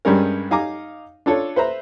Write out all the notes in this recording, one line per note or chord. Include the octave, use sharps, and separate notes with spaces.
G2 G3 G#3 C#4 A#4
D#4 F5 G#5 A#5 D6
D4 F4 A4 C#5
B4 C5 E5 A#5